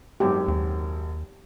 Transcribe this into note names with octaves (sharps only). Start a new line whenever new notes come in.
G#1 F#2 G4
D#2